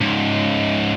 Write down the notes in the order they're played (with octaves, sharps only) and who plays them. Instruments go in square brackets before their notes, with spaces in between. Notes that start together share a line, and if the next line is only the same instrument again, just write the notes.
[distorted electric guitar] C#2 G#2